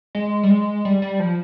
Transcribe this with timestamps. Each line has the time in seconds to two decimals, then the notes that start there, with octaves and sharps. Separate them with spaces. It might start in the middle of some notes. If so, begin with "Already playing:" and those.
0.15 G#3
0.43 G3
0.50 G#3
0.85 G3
1.02 G3
1.20 F3